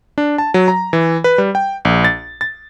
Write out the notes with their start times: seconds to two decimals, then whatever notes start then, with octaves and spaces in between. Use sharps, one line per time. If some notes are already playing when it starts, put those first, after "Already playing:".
0.18 D4
0.38 A5
0.54 F#3
0.68 A#5
0.93 E3
1.24 B4
1.38 G3
1.55 G5
1.85 A#1
2.04 A6
2.41 A6